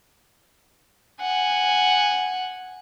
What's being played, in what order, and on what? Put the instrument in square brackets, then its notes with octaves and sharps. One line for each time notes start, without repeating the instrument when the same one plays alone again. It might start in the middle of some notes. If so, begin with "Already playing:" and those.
[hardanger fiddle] F#5 G#5